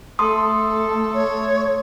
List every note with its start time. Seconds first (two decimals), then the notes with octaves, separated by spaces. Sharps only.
0.19 A3 A4 C6 D#6
1.14 C#5